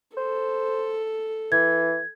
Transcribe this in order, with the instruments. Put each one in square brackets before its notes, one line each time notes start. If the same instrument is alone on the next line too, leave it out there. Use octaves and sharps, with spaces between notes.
[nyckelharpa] A4 [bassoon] C5
[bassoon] E3 [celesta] G#6